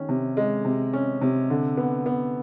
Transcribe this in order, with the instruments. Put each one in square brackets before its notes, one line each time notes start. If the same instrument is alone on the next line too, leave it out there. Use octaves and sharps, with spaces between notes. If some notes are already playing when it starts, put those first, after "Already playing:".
Already playing: [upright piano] D#3 C#4
C3
G#3
C3
C#4
C3
D3
B3
B3